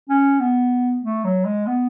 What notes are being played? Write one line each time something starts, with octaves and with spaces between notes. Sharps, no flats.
C#4
B3
A3
F#3
G#3
B3